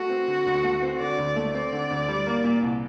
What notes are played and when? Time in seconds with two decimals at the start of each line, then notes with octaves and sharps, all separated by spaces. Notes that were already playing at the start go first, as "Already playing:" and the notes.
Already playing: A3 F#4
0.10 C4
0.28 D3
0.46 D2
0.64 A3
0.82 C4
1.00 D3 D5
1.18 D2
1.36 A3
1.54 C4 D5
1.72 D3
1.91 D2
2.08 G3
2.26 A#3
2.44 A#2
2.62 C2